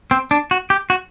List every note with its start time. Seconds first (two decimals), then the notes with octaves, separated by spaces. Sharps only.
0.11 C4
0.31 D4
0.51 F#4
0.70 G4
0.90 F#4